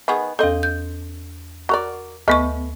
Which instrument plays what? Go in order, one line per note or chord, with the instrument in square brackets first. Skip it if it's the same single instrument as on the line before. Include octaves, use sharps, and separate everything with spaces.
[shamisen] D#3 B3 G#4
[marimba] E2 A4 [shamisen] C4 D#5
[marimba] G6
[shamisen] F#4 A#4 D5
[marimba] D2 B3 C#6 [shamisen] A3 B4